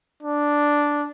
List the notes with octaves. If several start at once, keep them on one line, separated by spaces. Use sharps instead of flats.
D4